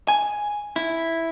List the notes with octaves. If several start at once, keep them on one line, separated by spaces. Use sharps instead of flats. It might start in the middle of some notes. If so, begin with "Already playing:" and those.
G#5
E4